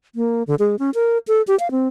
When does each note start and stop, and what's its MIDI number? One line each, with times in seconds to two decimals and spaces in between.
0.15 0.43 58
0.47 0.55 50
0.59 0.76 56
0.79 0.90 61
0.94 1.18 70
1.28 1.42 69
1.47 1.58 67
1.59 1.71 77
1.71 1.88 60